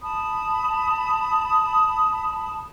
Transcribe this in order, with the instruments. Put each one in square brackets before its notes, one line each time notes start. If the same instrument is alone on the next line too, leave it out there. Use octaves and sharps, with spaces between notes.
[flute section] A5 B5 D#6